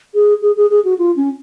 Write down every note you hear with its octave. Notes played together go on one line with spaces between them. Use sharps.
G#4
G#4
G#4
G#4
F#4
F4
C#4